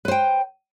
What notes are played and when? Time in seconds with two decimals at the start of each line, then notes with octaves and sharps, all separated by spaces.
0.05 B4
0.08 C5
0.11 G5